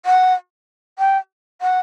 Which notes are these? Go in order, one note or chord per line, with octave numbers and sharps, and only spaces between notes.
F#5
G5
F#5